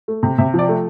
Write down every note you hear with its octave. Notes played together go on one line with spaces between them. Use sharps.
A3
C3
C3 E5
F3 D5
A3